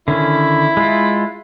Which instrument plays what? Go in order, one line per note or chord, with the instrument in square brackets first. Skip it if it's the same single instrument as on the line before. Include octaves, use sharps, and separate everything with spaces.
[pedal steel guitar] D3 D#3 C#4 [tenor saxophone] E4
[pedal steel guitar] G#3 F4